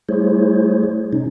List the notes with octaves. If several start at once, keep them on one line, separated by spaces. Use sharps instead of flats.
G3 A3 E4 G#4 C5 C#5
C3 C#4 D#4